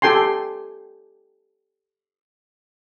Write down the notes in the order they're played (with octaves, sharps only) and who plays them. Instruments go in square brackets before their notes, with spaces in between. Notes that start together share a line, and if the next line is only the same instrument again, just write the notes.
[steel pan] G4 A4 G5 G#5 C6